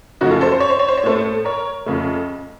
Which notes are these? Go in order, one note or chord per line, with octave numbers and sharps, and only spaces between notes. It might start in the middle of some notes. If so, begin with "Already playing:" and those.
F#2 C#3 F3 A3 D#4 F#4
F4 A4
A4 C5
C5
C#5
C5
C#5
C5
C#5
A2 A3 A4 C5
A#4 C#5
F2 C#3 A3